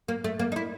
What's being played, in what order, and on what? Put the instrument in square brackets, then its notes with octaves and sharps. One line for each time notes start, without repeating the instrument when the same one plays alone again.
[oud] A#3
A3
A#3
D#4
E4